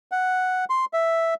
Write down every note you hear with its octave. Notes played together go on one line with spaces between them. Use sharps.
F#5
C6
E5